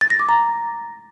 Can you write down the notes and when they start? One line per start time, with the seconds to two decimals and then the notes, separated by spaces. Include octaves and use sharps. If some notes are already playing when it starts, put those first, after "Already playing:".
0.01 A6
0.10 A#6
0.19 D6
0.29 A#5